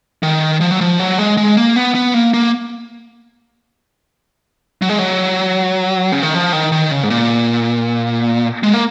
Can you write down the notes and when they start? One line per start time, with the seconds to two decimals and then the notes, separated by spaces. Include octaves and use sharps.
0.23 D#3
0.61 F3
0.71 F#3
0.81 F3
1.00 F#3
1.18 G#3
1.37 G#3
1.57 A#3
1.76 B3
1.94 B3
2.14 A#3
2.33 A#3
4.82 F#3
4.89 G#3
4.99 F#3
6.12 C#3
6.23 D#3
6.34 F3
6.52 D#3
6.72 D#3
6.91 C#3
7.04 G#2
7.10 A#2
8.63 G#3
8.74 A#3